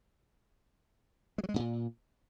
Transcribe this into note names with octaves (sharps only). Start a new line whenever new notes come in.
G#3
F#3
G#3
G#2
A#2